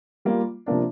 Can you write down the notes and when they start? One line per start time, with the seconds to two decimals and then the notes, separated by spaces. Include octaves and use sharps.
0.25 G3 A#3 F4
0.66 C3 F3 A#3 D4